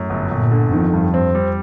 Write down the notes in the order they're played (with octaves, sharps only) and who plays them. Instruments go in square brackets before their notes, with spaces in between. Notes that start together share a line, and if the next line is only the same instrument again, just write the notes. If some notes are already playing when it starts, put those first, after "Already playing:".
Already playing: [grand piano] F#2 [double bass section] A2
[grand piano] G1
[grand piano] G1 [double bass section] A#2
[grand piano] D3
[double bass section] F2 [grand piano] D#3
[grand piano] G2
C4
G3